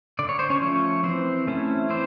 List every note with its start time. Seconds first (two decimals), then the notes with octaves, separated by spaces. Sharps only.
0.19 D3 D5
0.29 C#5
0.39 C5
0.50 C#4 C#5
0.62 F3 A3 C#4 C#5
1.04 E3 C4 C5
1.47 A3 C#4 E4
1.90 E3 C4 C5